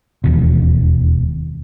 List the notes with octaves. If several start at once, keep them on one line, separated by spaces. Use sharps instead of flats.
E1 D#2 B2